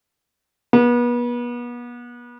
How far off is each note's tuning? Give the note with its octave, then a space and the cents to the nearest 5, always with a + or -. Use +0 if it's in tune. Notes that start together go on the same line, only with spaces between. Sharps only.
B3 -35